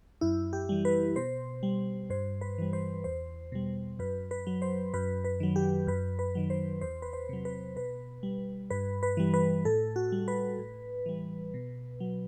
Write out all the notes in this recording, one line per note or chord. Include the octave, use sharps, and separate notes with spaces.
F#2 E4
G4
E3 G3
B4
B2 C5
G3
G2 C5
B4
E3 G3
C5
E2 C5
B2 G3
F#2 B4
B4
F#3
C5
F#2 B4
B4
D#3 F#3
G4
F#2 B4
B4
D#3 F#3
C5
E2 C5
B4
C5
C3 F#3
B4
B2 B4
G3
G2 B4
B4
E3 G3
B4
A2 A4
F#4
G3
B4
A2
E3 G3
B2
F#3